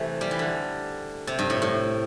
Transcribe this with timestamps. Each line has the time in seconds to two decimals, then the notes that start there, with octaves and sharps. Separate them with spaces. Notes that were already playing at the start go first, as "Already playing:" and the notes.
Already playing: C3 E3 A3
0.21 G3
0.31 E3
0.39 D3
1.27 C3
1.39 G2
1.50 A2
1.62 A2